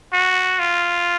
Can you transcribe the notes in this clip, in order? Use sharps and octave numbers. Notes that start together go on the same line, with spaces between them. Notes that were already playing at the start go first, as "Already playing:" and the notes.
F#4
F4